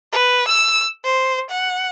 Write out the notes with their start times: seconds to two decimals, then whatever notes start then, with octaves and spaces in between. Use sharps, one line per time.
0.12 B4
0.48 E6
1.05 C5
1.50 F#5